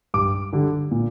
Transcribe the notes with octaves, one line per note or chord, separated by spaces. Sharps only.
G2 D6
D3 G3
A#2